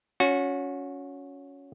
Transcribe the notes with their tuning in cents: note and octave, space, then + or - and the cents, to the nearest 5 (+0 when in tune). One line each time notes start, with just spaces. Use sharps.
C#4 +10 F#4 -25